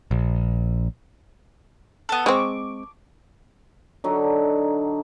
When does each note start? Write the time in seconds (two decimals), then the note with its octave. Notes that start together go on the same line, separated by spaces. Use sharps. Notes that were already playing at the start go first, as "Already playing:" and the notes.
0.11 A#1
2.09 B3 A4
2.26 G#3 C4 C#6 D6
4.04 D3 F#3 D#4